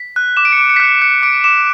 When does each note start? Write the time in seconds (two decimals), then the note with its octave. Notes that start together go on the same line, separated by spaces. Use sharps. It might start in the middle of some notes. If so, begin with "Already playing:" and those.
Already playing: B6
0.16 F#6
0.37 D6 E7
0.45 D7
0.52 C#7
0.58 D6 D7
0.70 C#7
0.76 B6
0.80 F#6 C#7
1.02 F#6 C#7
1.22 D6 D7
1.44 D6 E7